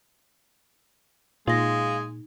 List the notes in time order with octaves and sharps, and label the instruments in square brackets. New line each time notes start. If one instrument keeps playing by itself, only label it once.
[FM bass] A#2 [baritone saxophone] G#3 [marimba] D#4 A#6 [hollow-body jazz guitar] F4